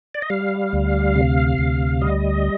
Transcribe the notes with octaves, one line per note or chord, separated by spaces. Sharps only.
D5
D#5
G3 F5
D2
C3
D2
G3 D#5